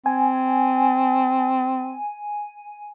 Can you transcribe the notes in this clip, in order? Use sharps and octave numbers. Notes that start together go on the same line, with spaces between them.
C4 G#5